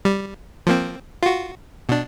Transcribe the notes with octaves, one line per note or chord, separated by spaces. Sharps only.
G3
F3 A#3 C4
F4 F#4
B2 D4